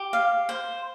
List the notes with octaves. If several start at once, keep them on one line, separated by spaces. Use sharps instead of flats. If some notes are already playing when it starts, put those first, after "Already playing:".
Already playing: G4
F5
C5